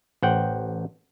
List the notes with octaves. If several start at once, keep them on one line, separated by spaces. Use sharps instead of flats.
A1 C5 F#5 G5